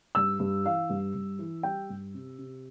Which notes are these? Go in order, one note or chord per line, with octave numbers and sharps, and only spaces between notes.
G2 E6
G2
E3 F5
G2
G2
E3
G3 G5
G2
C3
C3